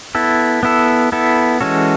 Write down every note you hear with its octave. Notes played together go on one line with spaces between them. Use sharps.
B3 E4 A4
B3 E4 A4
B3 E4 A4
E3 G#3 C#4 F#4 A4